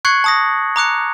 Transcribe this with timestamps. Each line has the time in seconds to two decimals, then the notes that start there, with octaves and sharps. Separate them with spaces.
0.05 C#6 F#6 G#6 C7 C#7 F#7
0.24 A5 D#6 A#6
0.76 A#5 D6 F#6 C#7